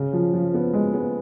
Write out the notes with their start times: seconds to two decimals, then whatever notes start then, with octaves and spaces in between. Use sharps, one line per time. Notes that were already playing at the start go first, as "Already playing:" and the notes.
Already playing: C#3
0.13 F3
0.33 F3
0.54 B3
0.74 G#3
0.94 B3